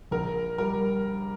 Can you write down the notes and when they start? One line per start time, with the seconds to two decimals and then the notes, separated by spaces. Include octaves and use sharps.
0.11 A#1 A#4
0.58 G3 A#4